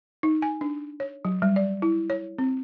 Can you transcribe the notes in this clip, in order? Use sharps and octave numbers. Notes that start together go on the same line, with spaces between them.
D#4
G#5
D4
C#5
F#3
G3
D5
E4
C#5
C4